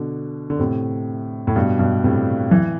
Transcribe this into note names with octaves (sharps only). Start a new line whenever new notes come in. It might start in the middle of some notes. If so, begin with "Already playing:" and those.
Already playing: B2 D3
D3
A2 C3
A2
G2 B2
G2 B2
A2 C3
E3